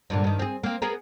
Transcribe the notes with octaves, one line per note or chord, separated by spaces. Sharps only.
G2 A#2 D3
G2 D#3
C4 G#4
A#3 C4
B3 G#4 A#4